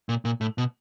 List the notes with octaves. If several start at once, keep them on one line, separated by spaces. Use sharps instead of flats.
A#2
A#2
A2
B2